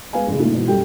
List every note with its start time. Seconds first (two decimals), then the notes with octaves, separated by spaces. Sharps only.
0.13 G#3 B3 F5 G#5
0.27 A1 C#3
0.40 A#2 D#3 E3 G#3 A3
0.53 G#2 B2 E3
0.68 F#1 G3 G4 A4 G5